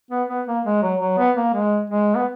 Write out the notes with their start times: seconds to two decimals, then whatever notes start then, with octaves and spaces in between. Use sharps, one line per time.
0.11 B3
0.29 B3
0.47 A#3
0.65 G#3
0.82 F#3
1.01 F#3
1.18 B3
1.37 A#3
1.54 G#3
1.90 G#3
2.15 B3